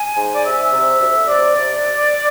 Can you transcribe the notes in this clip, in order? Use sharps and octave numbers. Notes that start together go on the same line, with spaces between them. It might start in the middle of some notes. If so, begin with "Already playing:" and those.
Already playing: G#5
G#2
D5
C3 E5
C3
D2
C3 D5
C3